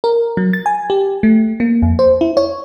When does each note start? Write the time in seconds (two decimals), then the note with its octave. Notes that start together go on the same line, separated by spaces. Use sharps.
0.04 A#4
0.37 F#3
0.53 A6
0.66 G#5
0.90 G4
1.23 A3
1.60 A#3
1.82 F2
1.99 C5
2.21 E4
2.37 C#5